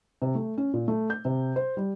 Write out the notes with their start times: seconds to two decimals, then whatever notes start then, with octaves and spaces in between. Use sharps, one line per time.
0.22 C3
0.35 A3
0.57 C#4
0.73 A#2
0.88 A3
1.10 G6
1.25 C3
1.56 C5
1.77 G3